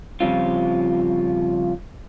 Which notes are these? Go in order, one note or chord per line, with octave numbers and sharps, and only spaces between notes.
C#3 F3 G3 C4 F4